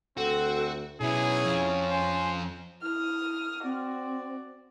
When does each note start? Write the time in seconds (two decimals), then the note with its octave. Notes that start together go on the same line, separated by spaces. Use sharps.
0.17 D2 C4 F#4 A4
1.01 B1 B3 C#4 E4 G#4
1.45 F2 F4
1.91 C5 G#5
2.82 E4 D#6 F6
3.64 C4 F#4 D5